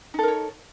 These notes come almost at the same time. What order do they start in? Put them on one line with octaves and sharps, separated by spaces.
D#4 A4 A#4 C#5